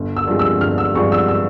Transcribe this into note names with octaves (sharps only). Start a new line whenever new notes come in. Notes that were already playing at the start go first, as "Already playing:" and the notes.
Already playing: G1
E6
G2 F3 G#3 C4
E6
G1 F6
E6
G2 F3 G#3 C4 C#6
E6
E6